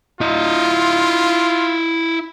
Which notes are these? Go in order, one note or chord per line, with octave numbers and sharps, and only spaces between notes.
E4 F4 D#5